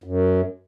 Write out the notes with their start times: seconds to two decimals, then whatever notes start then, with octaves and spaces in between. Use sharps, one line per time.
0.04 F#2